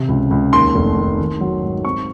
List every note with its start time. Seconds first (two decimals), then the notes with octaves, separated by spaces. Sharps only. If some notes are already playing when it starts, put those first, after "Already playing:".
Already playing: C3
0.09 C#2
0.31 C#2
0.53 D#2 C6
0.75 F1
0.97 D#2
1.19 D#3
1.41 F#3
1.63 G#2
1.85 C4 C#6